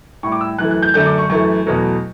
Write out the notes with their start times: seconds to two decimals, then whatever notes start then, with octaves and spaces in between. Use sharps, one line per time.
0.23 A2 C#6
0.26 G3
0.32 D6
0.41 E6
0.58 F#2 E3 A3 F#6
0.71 F#6
0.82 G6
0.94 F#2 D3 A3 G6
1.06 D6
1.18 C#6
1.30 F#2 E3 A3 C#6
1.66 E2 B2 F#3 A3